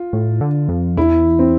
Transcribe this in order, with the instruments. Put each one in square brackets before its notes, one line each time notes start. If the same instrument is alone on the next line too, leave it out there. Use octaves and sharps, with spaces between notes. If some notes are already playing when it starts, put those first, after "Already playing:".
Already playing: [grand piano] F4
[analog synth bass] A2
D3
F2
[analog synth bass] E2 [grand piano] E4
[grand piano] C4